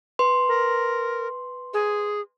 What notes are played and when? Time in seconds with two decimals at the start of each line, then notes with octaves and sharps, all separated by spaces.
0.19 B4 C6
0.48 A#4
1.74 G#4